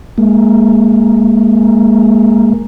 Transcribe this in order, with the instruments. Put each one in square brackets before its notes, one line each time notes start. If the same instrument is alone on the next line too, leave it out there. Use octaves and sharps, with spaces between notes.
[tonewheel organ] G#3 A#3